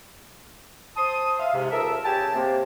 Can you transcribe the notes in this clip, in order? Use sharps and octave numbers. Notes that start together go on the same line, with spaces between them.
C5 A5 C6 D#6
E5 F5
G#2 C3
C#2 A4 A#4 E5
C#3 G4 G#5 A5
C3 A#3